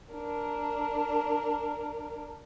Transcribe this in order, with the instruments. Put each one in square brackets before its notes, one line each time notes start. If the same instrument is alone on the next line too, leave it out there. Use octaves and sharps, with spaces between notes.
[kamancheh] D4 A#4